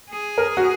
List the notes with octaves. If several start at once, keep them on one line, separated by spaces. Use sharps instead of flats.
G#4
A#4
F#4